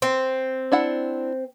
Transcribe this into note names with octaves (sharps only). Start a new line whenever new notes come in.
C4
D4 E4 F#5